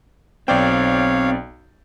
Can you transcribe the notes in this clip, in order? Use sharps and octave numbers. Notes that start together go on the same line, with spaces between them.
B1 C4 C#5 D5 F5 G5